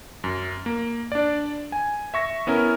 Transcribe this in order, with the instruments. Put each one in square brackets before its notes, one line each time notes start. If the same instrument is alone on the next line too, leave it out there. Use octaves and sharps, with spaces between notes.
[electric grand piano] F#2
A#3
D4 D5
G#5
E5 C#6 A#6
B3 C#4 E4 A#4